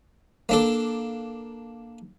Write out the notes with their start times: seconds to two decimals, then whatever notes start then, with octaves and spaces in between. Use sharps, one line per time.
0.49 A#3 D4 A4